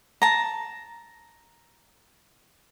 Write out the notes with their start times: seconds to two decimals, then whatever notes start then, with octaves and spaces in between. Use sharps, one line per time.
0.22 A5 A#5